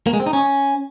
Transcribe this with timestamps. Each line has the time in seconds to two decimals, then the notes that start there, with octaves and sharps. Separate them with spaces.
0.07 A#3
0.13 G#3
0.20 C4
0.27 D#4
0.33 C#4